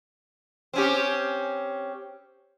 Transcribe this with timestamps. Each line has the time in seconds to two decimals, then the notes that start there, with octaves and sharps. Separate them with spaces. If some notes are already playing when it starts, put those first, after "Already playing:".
0.73 C4 C#4 G4